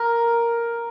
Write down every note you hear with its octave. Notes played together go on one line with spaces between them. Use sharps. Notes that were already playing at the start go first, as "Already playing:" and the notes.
Already playing: A#4